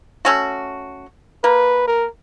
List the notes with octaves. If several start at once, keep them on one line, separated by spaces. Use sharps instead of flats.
A3 C#4 F#4
A#3 B4
A#4